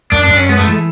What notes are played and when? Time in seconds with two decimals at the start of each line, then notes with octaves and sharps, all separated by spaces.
0.12 F#2 D4
0.24 D4
0.30 F#2
0.37 C#4
0.49 G#3 B3
0.57 A3
0.67 E3